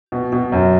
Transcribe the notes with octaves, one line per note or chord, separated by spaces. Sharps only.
B2
B2
F#2